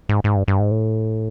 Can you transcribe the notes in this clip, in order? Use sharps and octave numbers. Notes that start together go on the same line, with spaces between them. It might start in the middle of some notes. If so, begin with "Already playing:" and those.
G#2
G#2
G2
G2
G#2
A2